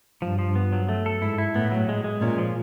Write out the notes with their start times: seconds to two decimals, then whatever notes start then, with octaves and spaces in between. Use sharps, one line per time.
0.22 G2 F3
0.39 F3
0.55 B3
0.73 F#3
0.89 A3
1.06 A4
1.22 G#2 E4
1.38 E4
1.55 A2 B3
1.72 F#3
1.89 G#3
2.04 G#3
2.21 A#2 C#4
2.38 F3